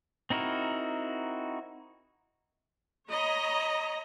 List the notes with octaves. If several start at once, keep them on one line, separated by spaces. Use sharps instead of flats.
C4 D#4 E4 F#4 A#4
C#5 D#5 A#5 B5